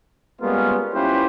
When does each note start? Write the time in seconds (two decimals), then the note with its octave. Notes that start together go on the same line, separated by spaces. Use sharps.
0.41 G3 G#3 A#3 B3 C#4 F4
0.93 C#4 E4 F4 G4 B4 C5